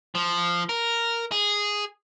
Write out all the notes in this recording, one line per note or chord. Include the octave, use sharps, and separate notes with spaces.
F3
A#4
G#4